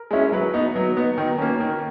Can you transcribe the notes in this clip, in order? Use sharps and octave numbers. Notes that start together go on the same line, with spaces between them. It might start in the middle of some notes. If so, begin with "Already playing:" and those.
Already playing: A#4
G#3 C#4 E4
F#3 B4
B3 D#4
F#3
B3 D#4
D#3
A#3 C#4
D#3